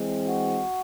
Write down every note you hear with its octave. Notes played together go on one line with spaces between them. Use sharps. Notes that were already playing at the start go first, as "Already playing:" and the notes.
Already playing: E3 G#3 C4
F#4